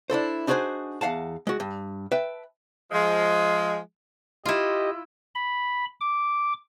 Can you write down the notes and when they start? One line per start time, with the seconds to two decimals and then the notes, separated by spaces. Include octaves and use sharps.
0.10 D4 E4 A4 C5
0.47 D4 D#4 F#4 G#4 C5 G#5
1.01 E2 F5 F#5 A5
1.47 G#3 F#4
1.60 G2
2.12 B4 E5 G5 A5
2.92 F3 G#3
4.46 E4 F4 G4 D#5
5.35 B5
6.01 D6